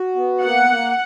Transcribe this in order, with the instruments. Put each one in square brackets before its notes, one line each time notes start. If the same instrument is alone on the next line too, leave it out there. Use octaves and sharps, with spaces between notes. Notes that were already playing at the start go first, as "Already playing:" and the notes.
Already playing: [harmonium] F#4
B3
[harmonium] A#3 [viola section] F#5
[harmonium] A#3